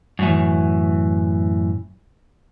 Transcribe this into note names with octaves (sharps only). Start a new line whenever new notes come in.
F#2 A2 E3